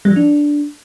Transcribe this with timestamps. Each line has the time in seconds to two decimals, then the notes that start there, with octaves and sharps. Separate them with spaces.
0.05 G3
0.11 F3
0.16 D4